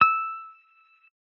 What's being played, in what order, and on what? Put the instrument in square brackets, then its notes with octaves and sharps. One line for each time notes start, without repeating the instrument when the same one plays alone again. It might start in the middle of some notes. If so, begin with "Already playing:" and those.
[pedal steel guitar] E6